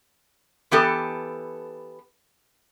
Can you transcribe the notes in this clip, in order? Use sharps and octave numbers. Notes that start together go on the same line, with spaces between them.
E3 B3 G4 A4